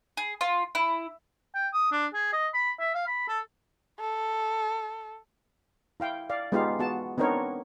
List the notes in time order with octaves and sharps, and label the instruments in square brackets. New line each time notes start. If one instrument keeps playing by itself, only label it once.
[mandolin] G#4
F4
E4
[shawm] G5
D#6
D4
G#4
D#5
B5
E5
F5
B5
A4
[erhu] A4
[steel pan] E4 F5 G5
D5 F5
G#3 B3 D#4 F4 G4 F5
B3 F#4 A5
B3 C4 D4 D#4 A#4 C#5